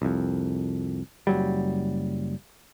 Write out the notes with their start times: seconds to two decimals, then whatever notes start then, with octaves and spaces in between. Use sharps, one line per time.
0.02 C2 F2
1.27 F#1 F#3 G3